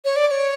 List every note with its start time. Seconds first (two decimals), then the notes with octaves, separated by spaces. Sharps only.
0.05 C#5
0.16 D5
0.27 D5
0.31 C#5